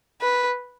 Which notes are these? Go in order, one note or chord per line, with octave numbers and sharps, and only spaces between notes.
B4